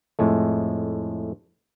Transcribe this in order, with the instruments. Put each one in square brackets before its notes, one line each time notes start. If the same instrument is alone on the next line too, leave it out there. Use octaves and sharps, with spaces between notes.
[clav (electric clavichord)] F2 A2 G#3 A3